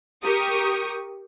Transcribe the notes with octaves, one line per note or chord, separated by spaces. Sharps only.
G4 A#4 C#6 D#6